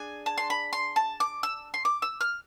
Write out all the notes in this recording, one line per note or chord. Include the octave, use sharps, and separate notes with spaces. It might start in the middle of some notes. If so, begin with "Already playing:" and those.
Already playing: D4 G#4 G#5
A5
C6
B5
C6
A5
D6
E6
C6
D6
E6
F6